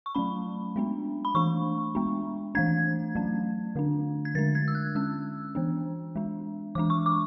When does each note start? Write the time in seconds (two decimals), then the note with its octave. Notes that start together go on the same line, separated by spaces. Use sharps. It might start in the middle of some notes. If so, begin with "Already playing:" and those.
0.06 C#6
0.15 F#3 A3 C#4 B5
0.76 G#3 B3 D4
1.25 B5
1.35 E3 A3 D4 C#6
1.95 G#3 B3 D4
2.55 E3 A3 D4 G#6
3.15 F#3 A3 C#4
3.75 D3 A3 D4
4.25 G#6
4.35 D3 G#3 D4 A6
4.55 G#6
4.68 E6
4.75 F#6
4.95 G#3 C#4 E6
5.55 E3 B3 D4
6.16 G#3 D4
6.75 E3 G#3 D4 D6
6.90 C#6
7.06 D6